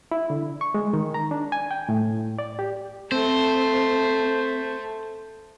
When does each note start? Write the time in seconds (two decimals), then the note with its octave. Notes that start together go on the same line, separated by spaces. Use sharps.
0.11 E4
0.30 D3
0.61 C#6
0.74 G#3
0.93 D#3
1.14 A#5
1.31 D4
1.52 G#5
1.71 G5
1.89 A2
2.39 D5
2.59 G4
3.12 A3 C4 C5